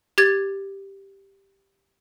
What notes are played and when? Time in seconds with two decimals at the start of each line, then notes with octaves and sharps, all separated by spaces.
0.18 G4 G#6 A6